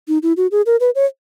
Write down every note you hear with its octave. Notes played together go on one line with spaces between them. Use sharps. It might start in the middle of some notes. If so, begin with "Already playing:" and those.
D#4
E4
F#4
G#4
A#4
B4
C#5